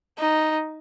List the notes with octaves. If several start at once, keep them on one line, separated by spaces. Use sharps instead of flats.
D#4